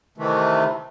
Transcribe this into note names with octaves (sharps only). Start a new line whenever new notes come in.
C3 D#3 E3 A3